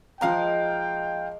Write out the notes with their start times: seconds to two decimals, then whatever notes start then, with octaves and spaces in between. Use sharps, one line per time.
0.21 F3 G#3 A#3 D#4 F5 G5 A#5